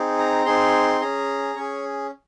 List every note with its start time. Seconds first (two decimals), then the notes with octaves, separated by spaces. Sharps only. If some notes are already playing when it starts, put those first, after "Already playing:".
Already playing: C4 D#4 G#4
0.18 A#5
0.46 C4 D#4 G#4 C6
1.01 C#4 G#4 A#5
1.56 C#4 G#4 C#5